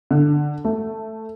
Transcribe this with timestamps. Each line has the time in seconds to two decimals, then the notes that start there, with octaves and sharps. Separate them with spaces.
0.11 D3
0.65 A3